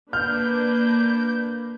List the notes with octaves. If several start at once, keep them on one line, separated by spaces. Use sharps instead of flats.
A#3 D4 B4 F6 G6